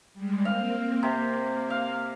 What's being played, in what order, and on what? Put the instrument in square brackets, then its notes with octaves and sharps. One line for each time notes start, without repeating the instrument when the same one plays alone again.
[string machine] G3 G#3
[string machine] A#3 C4 [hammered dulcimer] F5
[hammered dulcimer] C3 [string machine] A#3
[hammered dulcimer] F5